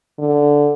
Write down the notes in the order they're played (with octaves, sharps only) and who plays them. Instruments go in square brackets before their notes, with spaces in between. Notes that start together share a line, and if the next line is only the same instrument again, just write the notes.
[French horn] D3